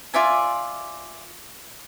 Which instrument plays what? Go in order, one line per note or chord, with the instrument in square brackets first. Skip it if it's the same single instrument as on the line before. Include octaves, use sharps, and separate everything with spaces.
[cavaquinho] F4 D5 E5 G#5